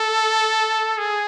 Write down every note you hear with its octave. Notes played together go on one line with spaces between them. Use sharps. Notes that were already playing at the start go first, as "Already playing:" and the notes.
Already playing: A4
G#4